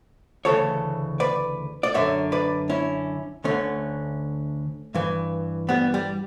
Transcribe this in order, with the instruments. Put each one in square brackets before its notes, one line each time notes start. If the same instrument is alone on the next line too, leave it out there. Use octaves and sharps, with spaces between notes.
[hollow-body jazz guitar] D2 C#3 E3 A4 C#5
B4 D5
D5
F#2 D3 C#5 E5
B4 D5
C#4 E4
D2 D3 A3 C#4
G2 E3
G3 B3
G3